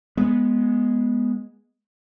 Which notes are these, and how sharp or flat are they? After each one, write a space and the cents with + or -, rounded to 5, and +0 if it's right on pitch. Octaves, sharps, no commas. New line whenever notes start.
G#3 +0 B3 -10